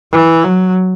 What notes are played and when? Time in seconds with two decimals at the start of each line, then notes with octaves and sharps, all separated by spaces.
0.12 E3
0.44 F#3